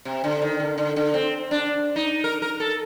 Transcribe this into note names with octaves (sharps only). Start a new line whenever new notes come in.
C3
D3
D#3
D3
D3
D3
C4
D4
D#4
A#4
A#4
A4